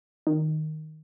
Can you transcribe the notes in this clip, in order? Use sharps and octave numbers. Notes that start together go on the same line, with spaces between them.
D#3